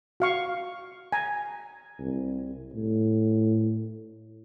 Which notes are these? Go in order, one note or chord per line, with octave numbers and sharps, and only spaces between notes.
F#4 F5 C#6
G#5 A#5
C2
A2